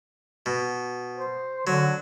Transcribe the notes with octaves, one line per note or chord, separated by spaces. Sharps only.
B2
C5
D3 F#3